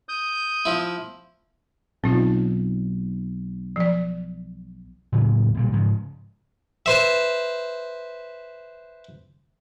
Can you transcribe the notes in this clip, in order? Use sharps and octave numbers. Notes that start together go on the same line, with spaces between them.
D#6 G6
F3 E4
B1 C4 D#4 F4
F3 D5
A2 C#3 F#3 A#3
B1 A#2 G3
G#2 C#3 F3
B4 C5 E5